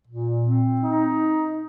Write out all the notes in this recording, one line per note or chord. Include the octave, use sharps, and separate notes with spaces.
A#2
C4
D#4